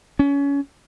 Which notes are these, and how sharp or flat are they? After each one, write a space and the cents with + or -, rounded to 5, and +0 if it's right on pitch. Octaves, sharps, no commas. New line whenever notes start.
C#4 +25